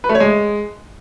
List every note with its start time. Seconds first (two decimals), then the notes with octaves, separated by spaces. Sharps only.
0.04 B4
0.09 A3
0.15 C#5
0.20 G#3